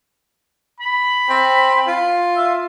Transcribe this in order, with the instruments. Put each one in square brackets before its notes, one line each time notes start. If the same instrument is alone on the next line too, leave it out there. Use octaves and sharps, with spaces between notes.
[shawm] B5
[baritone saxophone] C4
F4
[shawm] E5